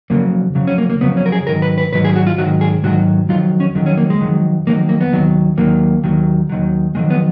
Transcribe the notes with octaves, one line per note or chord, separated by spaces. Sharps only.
F2 C#3 F#3 A#3
F2 C#3 F#3
C#4
A#3
A#3
F2 C#3 F#3 B3
C#4
A#4
G#4
G#2 D#3 F#3 A#4
B4
B4
G#2 D#3 F#3 B4
G#4
F#4
F4
G#2 D#3 F#3 F#4
G#4
G#2 D#3 F#3 F#4
F2 D#3 F#3 F4
C#4
F2 D#3 F#3
C#4
A#3
G#3
F2 D#3 F#3
F2 D#3 F#3 A#3
A#3
B3
D#2 D#3 F#3
D#2 D#3 F#3 A#3
D#2 D#3 F#3
D#2 D#3 F#3
F2 D#3 F#3 G#3
B3